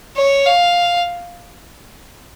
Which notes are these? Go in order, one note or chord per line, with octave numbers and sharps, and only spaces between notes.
C#5
F5